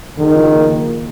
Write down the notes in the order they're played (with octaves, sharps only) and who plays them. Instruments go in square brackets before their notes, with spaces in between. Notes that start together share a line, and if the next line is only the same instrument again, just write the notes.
[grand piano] F#1 [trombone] D#3
[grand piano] F3
A#3